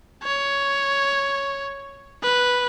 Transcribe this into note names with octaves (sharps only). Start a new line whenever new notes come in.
C#5
B4